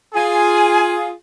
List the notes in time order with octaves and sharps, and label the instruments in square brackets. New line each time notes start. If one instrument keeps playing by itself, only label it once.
[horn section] F4 G#4 [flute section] G#5